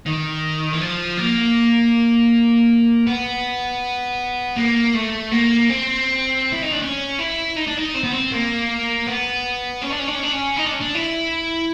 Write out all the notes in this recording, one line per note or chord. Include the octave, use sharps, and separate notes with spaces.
D#3
E3
F3
A#3
B3
A#3
A3
A#3
C4
E4
D#4
D4
C#4
E4
D#4
D4
D#4
C4
B3
C4
A#3
B3
C#4
D4
C#4
D4
C#4
D4
C#4
D#4
D4
C#4
D4
E4